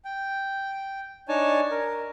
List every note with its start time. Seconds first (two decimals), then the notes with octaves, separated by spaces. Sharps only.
0.05 G5
1.28 D4 D#4 C#5 G#5 A5
1.71 A#4